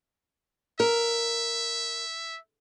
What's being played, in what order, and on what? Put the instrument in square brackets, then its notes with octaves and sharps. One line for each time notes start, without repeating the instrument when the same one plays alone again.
[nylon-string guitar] A#4 [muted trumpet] E5